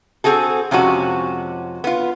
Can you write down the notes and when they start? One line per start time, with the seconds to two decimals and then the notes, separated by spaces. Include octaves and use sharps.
0.24 C4 F#4 G#4 A4
0.71 F2 C3 G#3 C#4 F#4
1.84 B3 F4